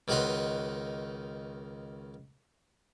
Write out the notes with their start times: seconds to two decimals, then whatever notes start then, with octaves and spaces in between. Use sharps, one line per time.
0.08 C#2 D#3 D#4 F#4 B4 C6